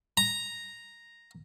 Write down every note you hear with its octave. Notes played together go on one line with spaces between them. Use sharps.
A#5